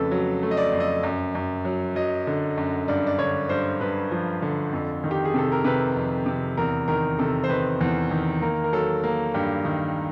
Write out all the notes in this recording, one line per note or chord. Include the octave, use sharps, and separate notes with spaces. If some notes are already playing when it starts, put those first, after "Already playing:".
Already playing: F2 C#3 A3 A4 B4
F#3
A3
D#5
D5
F2
D#5
F#2
F#2
F#3
F#3 D#5
D3
F#2
G2 D5
D5
D3 C#5
G2 C5
G2 B4
F3
D3
F2
D#3
G4
G#4
C3 A4
A#4
C3 B4
F2
C3
E2 A#4
D#3 A#4
C3 A4
C5
D#3 B4
E2
D#3
A#3 A#4
A#4
F#3 A4
A#3
G2 G4
D#3